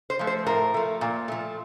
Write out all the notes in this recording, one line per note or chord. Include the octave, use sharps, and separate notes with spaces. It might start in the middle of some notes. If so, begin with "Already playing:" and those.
C5
F3 A3
C5
A2 A#4
F3 A3
A#2
F3 A3